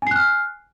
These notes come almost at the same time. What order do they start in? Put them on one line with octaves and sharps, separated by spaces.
G#5 C7 F#6 F6